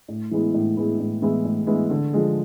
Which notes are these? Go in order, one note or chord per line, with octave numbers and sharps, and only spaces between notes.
A2
E3 G#3 B3 E4
A2
E3 G#3 B3 E4
A2
E3 G#3 B3 E4
A2
E3 G#3 B3 E4
D3
F3 G#3